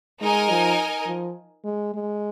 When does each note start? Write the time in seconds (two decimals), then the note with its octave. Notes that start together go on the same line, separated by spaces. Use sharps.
0.20 G#3 D#4 A#4 D#5 G#5
0.50 F3
1.07 F3
1.64 G#3
1.94 G#3